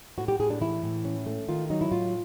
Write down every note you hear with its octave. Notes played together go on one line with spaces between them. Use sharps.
A2 F#4
G4
A2 G#4
D4
E3 E4
A2
C#4
A3
D#3 F4
F#3 D#4
E4
A2 F4